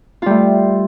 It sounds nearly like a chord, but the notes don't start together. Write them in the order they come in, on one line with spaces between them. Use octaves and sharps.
F4 G3 A3